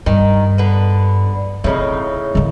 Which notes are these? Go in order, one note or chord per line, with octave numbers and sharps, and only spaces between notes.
G2 D#3
D3 B3
A2 C#3 C4 D#4
D3 D#3